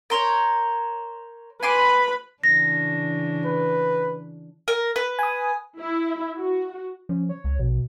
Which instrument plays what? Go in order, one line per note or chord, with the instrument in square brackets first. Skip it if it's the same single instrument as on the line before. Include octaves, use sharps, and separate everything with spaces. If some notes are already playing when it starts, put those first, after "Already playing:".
[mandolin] A#4 C5 C#5
[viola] B4 B5 [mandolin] G#5 C6 D6
[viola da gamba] C#3 E3 D4 [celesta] A#6
[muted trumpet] B4
[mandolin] A#4
B4
[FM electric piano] G#5 D#6
[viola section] E4
F#4
[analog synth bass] F3 [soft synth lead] C#4
[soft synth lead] C#5
[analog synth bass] C#2
[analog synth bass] A#1 [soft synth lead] B2